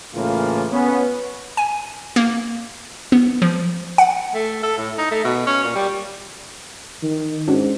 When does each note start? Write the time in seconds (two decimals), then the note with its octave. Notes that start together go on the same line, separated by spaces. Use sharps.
0.15 A2 C#3 E3 A#3 F4
0.72 B3 C#4
1.57 G#5
2.16 A#3
3.12 B3
3.42 F3
3.98 F#5
4.34 A3
4.63 A4
4.78 A2
4.98 D#4
5.11 A3
5.24 B2
5.47 C#4
5.64 A#2
5.75 G3
7.03 D#3
7.48 G#2 C#4 D4 F#4